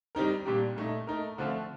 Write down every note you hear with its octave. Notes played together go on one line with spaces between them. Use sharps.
D#3 G3 C4 D#4 A#4
A#2 G3 D4 G4
A#2 A3 D#4
A3 D#4 A#4
D3 F3 A3 C4 F4